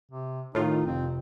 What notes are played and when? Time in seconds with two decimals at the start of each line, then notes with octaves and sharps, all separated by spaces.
0.11 C3
0.55 A2 D#3 D#4 F4
0.86 F1 C4